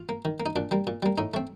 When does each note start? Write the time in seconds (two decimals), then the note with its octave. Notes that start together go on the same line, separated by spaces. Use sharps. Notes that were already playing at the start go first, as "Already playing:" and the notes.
Already playing: F4
0.09 A#3
0.25 D#3
0.40 A#3
0.46 D#4
0.56 A#2 D4
0.71 G3 A#3
0.87 A#2
1.03 G3 A#3
1.18 A2 D#4
1.34 A3 C4